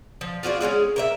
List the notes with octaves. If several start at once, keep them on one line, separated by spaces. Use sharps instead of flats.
F3
F4 F#4 G#4 D5
G#3 C#4 F4 G#4
A#4 C#5 E5